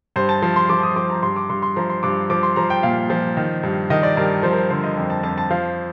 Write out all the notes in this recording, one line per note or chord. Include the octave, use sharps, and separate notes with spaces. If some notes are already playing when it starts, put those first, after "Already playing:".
G2 C5
A5
F3
C6
F3 D6
D#6
F3 D6
A#5
G2 C6
D6
G2 C6
C6
F3 A#5
C6
G2 D6
F3 D6
C6
F3 A#5
G5
A#2 F5
F3
D#3
G2
D#3 D#5
D5
G2 A#4
F3 C5
A#4
C5
D3 C5
D#5
F2
A5
F2 A5
A5
F3 F5